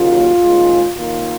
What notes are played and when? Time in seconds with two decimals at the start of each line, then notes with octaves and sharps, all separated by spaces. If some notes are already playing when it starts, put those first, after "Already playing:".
Already playing: D#2 C#3 F#3 A#3 F4
0.41 D#2 C#3 G#3
0.96 D#2 D#3 A#3 F4